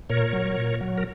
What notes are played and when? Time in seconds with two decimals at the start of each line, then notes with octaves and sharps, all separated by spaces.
0.09 A#2 A#4 C#5
0.33 F#3
0.57 A#2
0.81 F#3
0.98 A#4